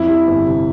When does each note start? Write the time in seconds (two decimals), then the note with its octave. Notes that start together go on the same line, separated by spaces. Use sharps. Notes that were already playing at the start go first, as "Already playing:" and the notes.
Already playing: F2 E4
0.08 G3
0.27 G1
0.46 C3